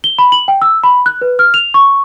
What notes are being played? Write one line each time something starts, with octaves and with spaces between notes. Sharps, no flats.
G7
B5
F#7
G5
E6
B5
F#6
B4
F6
F7
C#6